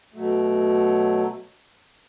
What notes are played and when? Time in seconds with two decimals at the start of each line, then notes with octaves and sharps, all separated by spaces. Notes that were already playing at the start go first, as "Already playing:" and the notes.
0.14 B2 F#3 A3